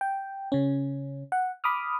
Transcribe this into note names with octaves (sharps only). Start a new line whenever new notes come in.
G5
C#3 C#4
F#5
B5 D6 D#6 F6